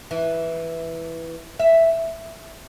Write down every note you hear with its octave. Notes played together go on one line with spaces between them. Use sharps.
E3
E5